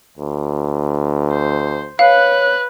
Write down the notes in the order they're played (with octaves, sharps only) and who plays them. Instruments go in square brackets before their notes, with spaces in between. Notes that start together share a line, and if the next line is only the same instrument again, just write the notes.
[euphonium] D2
[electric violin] C5
[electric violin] B4 F#6 [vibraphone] C#5 [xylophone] F5